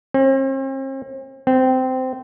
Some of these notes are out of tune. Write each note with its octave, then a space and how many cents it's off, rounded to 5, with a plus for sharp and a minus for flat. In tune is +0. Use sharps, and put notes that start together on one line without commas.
C4 +45
C4 -15